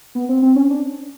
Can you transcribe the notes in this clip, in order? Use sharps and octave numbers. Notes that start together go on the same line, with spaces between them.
B3
C4
C4
C#4
D4